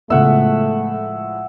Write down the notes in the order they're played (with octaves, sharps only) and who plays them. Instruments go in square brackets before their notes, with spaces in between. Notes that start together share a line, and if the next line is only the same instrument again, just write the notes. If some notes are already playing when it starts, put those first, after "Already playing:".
[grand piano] A2 F3 G#3 [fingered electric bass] C#3 B3 [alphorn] A3 [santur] E5 F#5